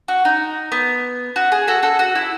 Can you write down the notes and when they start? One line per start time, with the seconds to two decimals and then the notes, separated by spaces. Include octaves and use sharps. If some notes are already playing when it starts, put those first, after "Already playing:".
0.08 F#4
0.25 D#4
0.72 B3
1.36 F#4
1.52 G#4
1.68 F#4 A4
1.83 F#4 A4
1.99 F#4
2.15 E4